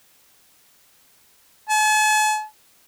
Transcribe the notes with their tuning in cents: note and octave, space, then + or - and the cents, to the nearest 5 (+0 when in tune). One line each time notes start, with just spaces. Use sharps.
A5 -45